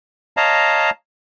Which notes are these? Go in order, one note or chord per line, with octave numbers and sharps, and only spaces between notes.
C#5 D#5 F5 A5 A#5